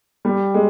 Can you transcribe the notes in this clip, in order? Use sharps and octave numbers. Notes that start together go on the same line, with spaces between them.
G3
G#3